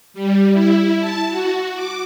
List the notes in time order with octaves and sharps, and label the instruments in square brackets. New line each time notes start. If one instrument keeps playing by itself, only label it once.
[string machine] G3
E4
A5
F#4
D6